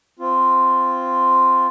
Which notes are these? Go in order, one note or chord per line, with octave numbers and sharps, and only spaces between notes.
C4 F4